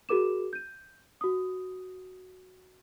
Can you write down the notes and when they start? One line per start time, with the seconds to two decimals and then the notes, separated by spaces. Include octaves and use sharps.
0.09 F#4 G#4 A#4 D6 E7
0.53 G6 D#7
1.21 F#4 D#6